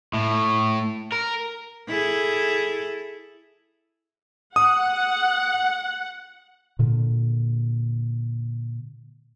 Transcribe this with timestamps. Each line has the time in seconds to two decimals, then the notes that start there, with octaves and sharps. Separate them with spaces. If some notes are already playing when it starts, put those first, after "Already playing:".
0.14 A2
1.12 A#4
1.88 E4 G#4 A4
4.56 F#5 D#6
6.79 A#2 D3